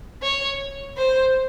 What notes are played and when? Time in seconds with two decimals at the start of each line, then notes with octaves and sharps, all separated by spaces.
0.23 C#5
0.97 C5